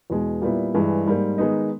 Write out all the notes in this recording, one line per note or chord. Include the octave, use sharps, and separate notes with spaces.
E2 B2 G#3
A#2 G3 B3 E4
G2 E3 G#3
G#2 G3 A#3
D#3 G#3 B3 D#4